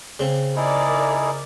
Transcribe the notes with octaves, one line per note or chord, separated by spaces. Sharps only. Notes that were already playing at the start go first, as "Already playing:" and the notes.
C#3 C4
D#4 E4 G#4 A#4 D5